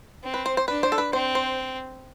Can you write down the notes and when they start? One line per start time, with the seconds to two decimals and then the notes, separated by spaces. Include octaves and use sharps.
0.24 C4
0.34 B4
0.46 C5
0.57 C5
0.68 D4 B4
0.83 C5
0.92 A4
0.98 B4
1.13 C4 C5
1.35 C5